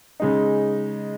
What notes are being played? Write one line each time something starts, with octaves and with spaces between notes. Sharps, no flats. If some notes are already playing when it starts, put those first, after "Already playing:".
C#3 G#3 D#4